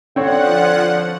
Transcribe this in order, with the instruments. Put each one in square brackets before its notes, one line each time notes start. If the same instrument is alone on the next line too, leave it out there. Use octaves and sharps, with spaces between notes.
[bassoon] D3 [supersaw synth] F3 F#5 [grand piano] C4 C#5 D5